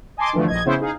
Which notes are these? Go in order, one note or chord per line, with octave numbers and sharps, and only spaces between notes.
D#5 G#5 A5 C6 D6
G2 D3 E3 F3 A3
A#1 D#5 G#6
C#3 B3 C#4 E4 C5
D#4 G#4 F5